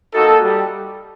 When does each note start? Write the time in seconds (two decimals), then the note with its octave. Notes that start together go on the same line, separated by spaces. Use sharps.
0.13 A#3 D#4 F#4 A4
0.43 G3